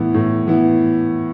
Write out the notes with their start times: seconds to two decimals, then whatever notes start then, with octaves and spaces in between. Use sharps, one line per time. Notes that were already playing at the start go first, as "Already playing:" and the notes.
Already playing: A2 E3 B3 E4
0.14 A2
0.47 E3 B3 E4